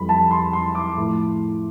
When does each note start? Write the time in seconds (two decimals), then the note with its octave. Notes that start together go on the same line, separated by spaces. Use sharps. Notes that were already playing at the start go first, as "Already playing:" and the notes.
Already playing: F2 E3 G3 B5
0.09 A5
0.31 C6
0.53 C6
0.75 D6
0.97 A2 F3